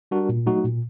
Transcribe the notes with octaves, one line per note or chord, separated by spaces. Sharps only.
G3 D4 F#4 A#4
A#2
F#3 A3 D#4 F#4
A#2